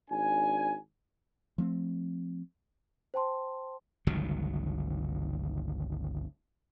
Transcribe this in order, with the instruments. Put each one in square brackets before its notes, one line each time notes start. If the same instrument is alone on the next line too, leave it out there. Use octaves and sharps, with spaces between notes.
[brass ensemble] G#1 D4 G#5
[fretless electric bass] F3 A3 C4
[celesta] C5 G5 A5 C6
[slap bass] G1 C#2 D#3 F#3